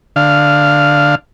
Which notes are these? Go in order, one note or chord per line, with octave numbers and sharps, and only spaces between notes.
D3 F5